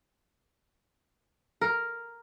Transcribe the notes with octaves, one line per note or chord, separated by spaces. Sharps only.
A#4